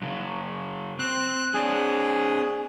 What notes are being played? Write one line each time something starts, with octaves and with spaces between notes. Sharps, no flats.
F#2 C#3
C4 F#6
C4 D4 G#4